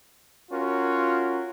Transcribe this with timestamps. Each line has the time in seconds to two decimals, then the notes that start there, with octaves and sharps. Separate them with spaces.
0.52 C#4 F4 F#4 A#4